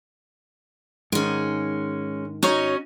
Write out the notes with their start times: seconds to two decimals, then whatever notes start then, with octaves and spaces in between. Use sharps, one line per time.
1.12 G#2 D#3 G#3 C#4
2.43 C#4 D#4 F#4 C#5 D#5